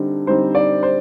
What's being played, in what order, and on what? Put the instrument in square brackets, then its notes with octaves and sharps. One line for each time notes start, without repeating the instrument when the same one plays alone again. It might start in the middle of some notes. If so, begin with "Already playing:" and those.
Already playing: [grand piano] D3 G3 C4 D#4
D3 G3 C4 D#4 C5
D5
C5